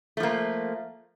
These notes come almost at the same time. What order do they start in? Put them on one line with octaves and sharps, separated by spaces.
A3 F3 A#3